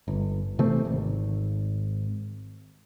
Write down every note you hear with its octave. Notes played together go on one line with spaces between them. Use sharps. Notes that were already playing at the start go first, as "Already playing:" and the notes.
G1
C3 E3 A3 C4
G#1